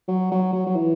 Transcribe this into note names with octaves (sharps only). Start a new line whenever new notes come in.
F#3
F#3
F#3
F#3
E3